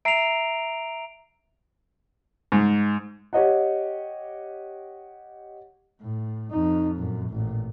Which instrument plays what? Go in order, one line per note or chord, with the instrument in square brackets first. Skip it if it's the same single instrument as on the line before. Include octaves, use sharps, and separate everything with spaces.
[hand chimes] E5 A#5 C7 [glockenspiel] D7 F7
[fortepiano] G#2
[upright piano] G4 C#5 D#5 F#5
[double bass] A2
F2 D#4
F#2 A#2
A1 A#2